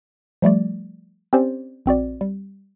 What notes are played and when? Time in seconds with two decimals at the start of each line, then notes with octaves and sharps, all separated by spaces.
0.42 F3 G3 A3 D5
1.33 C4 C#4 G4 C5 D5
1.86 A#1 C4 F#4 D5
2.21 G3